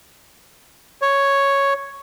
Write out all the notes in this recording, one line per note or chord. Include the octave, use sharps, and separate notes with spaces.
C#5